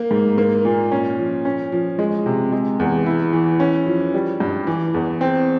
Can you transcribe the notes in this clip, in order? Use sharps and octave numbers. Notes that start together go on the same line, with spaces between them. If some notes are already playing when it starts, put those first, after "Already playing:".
Already playing: A#3
G#2
A#3
A#2
C#4
F3
C#4
F3
G#3
C3
G#3
E2
E4
E3
C#4
F3
G3
G2
E3
E2
C4